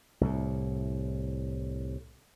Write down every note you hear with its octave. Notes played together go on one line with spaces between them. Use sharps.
C2 A2